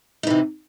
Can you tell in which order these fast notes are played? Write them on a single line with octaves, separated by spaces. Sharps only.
D#4 E3 C3